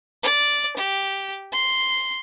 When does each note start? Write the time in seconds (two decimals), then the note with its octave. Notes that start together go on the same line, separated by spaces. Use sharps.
0.23 D5
0.77 G4
1.52 C6